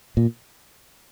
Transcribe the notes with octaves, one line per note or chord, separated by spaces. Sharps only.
A#2